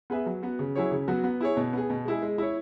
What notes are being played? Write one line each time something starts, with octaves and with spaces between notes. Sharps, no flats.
B3 G#4 B4 E5
F#3
B3 F#4
C#3
F#3 E4 G#4 C#5
C#3
F#3 B3 F#4
B3
E4 G#4 C#5
B2
B3 G#4
B2
G#3 E4 G#4
G#3
E4 C#5